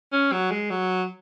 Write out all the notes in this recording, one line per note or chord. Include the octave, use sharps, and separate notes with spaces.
C#4
F#3
G#3
F#3